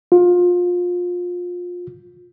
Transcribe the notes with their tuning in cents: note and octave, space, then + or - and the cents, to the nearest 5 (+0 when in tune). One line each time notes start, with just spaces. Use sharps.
F4 +25